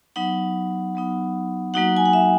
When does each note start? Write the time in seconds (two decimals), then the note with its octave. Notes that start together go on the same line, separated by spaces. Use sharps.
0.16 F#3 B3 D#4 F#5
0.95 F#3 B3 D#4
1.74 F#3 A#3 D#4 F#4 F#5
1.96 G#5
2.06 F#5
2.13 E5